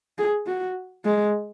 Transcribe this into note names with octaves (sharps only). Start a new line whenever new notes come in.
G#4
F#4
G#3